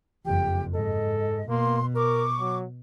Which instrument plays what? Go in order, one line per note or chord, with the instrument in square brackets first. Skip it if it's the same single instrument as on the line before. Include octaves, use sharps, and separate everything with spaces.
[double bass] F#1 F2 [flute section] G4 G5
[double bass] G#2 [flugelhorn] A4 [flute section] D#5
[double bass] B2 [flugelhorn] A#3 [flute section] C6
[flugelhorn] A#4 [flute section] C#6 D6
[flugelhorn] F#3